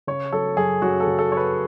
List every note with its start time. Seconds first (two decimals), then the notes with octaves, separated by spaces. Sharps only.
0.07 C#3 C#5
0.32 F#3 A4
0.57 F#2 G#4
0.82 F#2 F#4
1.00 A4
1.07 C#3
1.19 A4
1.31 F#3 C#5
1.37 B4